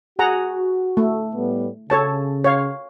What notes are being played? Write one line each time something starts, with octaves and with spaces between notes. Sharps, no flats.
F#4 G#4 F#5 A#5
A3
A2 G3 B3
C#3 A4 C#5 A5
C#5 F5